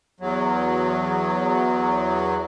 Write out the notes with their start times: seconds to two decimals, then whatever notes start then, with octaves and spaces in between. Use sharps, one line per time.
0.20 E2 F#3